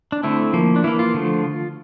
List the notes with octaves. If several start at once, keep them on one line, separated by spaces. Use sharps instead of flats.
D4
D3 A3 C4 E4
F3 A#3
D4
E3 A#3 E4
F4
D3 F3 A3